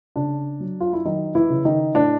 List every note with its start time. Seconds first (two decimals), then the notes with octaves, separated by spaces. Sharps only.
0.16 C#3 D4
0.60 F#3
0.80 F4
0.93 E4
1.05 D#3 F#3 D#4
1.35 E3 E4
1.50 C#3
1.65 D#3 D#4
1.94 A2 D4